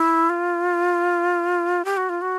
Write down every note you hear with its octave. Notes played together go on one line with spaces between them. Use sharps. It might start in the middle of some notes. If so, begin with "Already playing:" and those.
Already playing: E4
F4
G4
F#4
F4
F#4